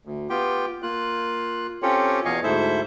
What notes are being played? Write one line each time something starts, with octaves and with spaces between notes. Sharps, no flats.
D2
B3 F4 G4 G5
A#3 F4 F#6
C4 C#4 F4 G4 A4 C#5
E2 B2 D#5 F5 G#5 C#6
D2 G#2 E4 A4 C5 E5